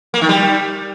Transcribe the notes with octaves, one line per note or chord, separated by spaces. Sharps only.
A#3
D#3
G3